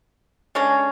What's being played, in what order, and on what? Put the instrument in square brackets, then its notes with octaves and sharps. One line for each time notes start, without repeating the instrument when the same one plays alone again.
[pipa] D3 G#3 C#4